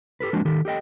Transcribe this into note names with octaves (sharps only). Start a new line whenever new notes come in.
G4 A4 B4
F3 G#3 A#3 C4 D4 F#4
D#3 G4 A4
G4 A4 D#5 G5